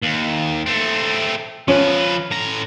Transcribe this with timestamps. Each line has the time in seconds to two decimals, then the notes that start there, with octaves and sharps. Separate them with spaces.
0.03 D#2
0.66 A3 C4
1.68 F3 C#4 B4
2.31 A2 A#5